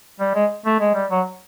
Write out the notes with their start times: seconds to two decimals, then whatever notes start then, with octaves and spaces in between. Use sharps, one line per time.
0.20 G3
0.35 G#3
0.66 A3
0.80 G#3
0.95 G3
1.10 F#3